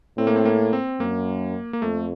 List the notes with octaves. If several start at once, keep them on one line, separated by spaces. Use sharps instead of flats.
A2 C4
A#3
C4
A#3
C4
F#2 A#3
A#3
F2 A3